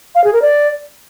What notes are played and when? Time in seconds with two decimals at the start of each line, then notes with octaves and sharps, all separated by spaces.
0.15 F5
0.24 G#4
0.33 A#4
0.42 D5